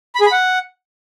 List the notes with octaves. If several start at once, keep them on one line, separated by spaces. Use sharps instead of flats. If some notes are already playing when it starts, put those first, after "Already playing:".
B5
G#4
B5
F#5